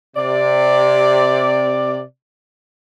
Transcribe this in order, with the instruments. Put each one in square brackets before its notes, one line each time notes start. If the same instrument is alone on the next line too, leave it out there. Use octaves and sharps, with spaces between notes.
[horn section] C3 D5